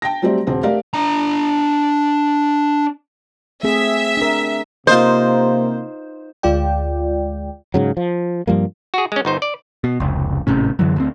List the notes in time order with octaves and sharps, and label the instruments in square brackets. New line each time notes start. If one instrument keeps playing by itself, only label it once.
[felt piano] G5 A5 A#6
F#3 G3 A3 C4 G4 D5
E1 C4 G#4
A3 G4 A#4 D5 F5
[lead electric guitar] D4 A#5
[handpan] A3 C4 G#4 [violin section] E5
[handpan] D4 A#4
[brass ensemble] C3 A#3 [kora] D#4 F4 [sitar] C5
[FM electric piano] D2 G#3 F4 D5 G5
[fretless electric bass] G#2 C#3 F#3
F3
G2 F3 G3 A#3
[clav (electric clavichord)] F#4 G#4
G#3 C#4
G1 D#4 C5
D5
[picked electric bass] B2
F1 C#2
G#1 A2 C3 C#4
F#2 D3 E3 F#3
D2 C4